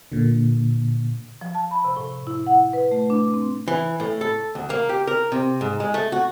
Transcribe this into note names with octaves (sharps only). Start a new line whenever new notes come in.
A#2 D3
F3
A5
B5
C3
A2
E4
F#5
B4
A3
D4
C4
E3
A2
A4
D2
A#3
G4
A#4
C3
G#2
G#3
A3
F#4